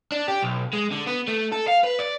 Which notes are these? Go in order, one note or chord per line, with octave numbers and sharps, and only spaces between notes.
D4
G4
B1
G#3
D3
B3
A3
A4
F5
B4
D5